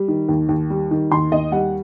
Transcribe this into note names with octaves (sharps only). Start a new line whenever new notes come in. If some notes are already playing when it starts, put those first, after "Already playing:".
Already playing: G3
D#3
D#2
D#2
G3
D#3
D#2 C6
D#2 D#5
G3 F#5